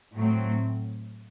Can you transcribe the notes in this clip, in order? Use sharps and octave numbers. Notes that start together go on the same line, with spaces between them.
A2 F#3 C4